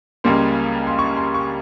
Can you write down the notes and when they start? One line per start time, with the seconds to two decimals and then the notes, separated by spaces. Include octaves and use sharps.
0.24 C#2 C#3 G3 A#3 C6
0.87 C6
0.99 C#6
1.17 C6
1.34 C#6